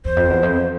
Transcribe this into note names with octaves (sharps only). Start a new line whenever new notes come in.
E2 C5
F2
E2
F2